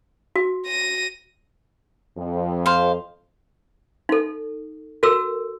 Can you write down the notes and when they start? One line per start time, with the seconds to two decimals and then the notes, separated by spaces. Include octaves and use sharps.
0.36 F#4
0.66 A#6 D#7
2.18 F2
2.66 C5 F5
4.09 D#4 A4
5.03 F#4 A4 A#4 E6